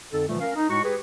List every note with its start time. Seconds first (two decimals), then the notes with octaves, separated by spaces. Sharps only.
0.13 F2 D3 D#4 A4
0.29 A#2 D3 E3 F3 G3 A3
0.41 C#4 A#4 F5
0.56 D#4
0.70 A2 G#3 F#4 C#6
0.84 G4 G#4 B4